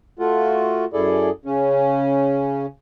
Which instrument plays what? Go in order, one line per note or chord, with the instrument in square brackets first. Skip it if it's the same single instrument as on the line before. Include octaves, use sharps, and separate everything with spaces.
[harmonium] A3 F4 F#4
F#2 E4 G#4 A4 D5
C#3 C#4